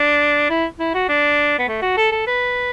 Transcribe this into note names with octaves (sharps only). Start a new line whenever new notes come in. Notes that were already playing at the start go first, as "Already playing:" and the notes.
Already playing: D4
E4
E4
F#4
D4
B3
A3
F#4
A4
A4
B4